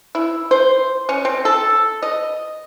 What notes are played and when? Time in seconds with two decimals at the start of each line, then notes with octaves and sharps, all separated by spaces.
0.15 E4
0.51 C5
1.09 C#4
1.25 C4
1.45 A4
2.03 D#5